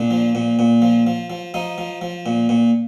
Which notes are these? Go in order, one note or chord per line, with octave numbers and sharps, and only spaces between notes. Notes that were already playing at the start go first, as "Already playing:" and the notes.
Already playing: A#2 D4
F3
A#2
A#2
F3
F3
F3
F3 D#4
F3
F3
A#2
A#2